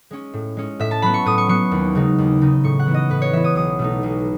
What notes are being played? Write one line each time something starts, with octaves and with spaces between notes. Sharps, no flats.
G#3 C#4
A2
G#3 C#4
A2 E5
A5
F#3 B3 B5
C#6
A2 D#6
C#6
F#3 B3 C#6
D#2
C#3 G#3 D#4
D#2
C#3 G#3 D#4
A2 C#6
F#5
E3 B3 E4
D#5
A2 B4
C#5
E3 B3 E4 E5
D#6
B1 D#6
B2 A3 D#4
B1